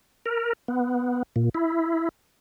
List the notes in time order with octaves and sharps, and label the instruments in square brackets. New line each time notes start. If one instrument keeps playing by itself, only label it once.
[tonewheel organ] A#4
B3
A#2
E4